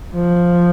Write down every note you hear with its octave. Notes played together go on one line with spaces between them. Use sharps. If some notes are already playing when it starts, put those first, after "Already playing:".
F3